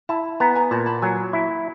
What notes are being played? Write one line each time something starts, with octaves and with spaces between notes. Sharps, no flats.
E4 A5 B5
B3 G#5 A#5
G#5 A#5
A#2 A5 B5
A5 B5
F#3 G#5 A#5
E4